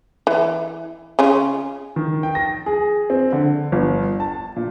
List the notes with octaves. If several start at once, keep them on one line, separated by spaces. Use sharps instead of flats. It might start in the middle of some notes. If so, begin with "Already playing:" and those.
E3
C#3 C#4 F4
D#3
G5
A#6
G#4
C4
D3
G1
A5
A#2